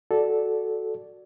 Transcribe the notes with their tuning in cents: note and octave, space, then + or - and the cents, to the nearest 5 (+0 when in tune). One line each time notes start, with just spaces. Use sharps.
F#4 +0 A4 -10 D5 +0